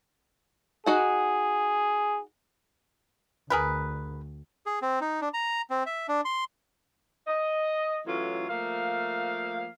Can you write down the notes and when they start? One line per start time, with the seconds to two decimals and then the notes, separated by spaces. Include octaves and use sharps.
0.86 D#4 F#4 G#4 F#5
3.50 D2 G#4 A#4 B4
4.66 G#4
4.82 C4
5.01 D#4
5.21 D4
5.34 A#5
5.70 C4
5.86 E5
6.08 D4
6.25 C6
7.27 D#5
8.06 A2 E3 F#3 C#4 F4
8.48 F3 A3 A#3 F5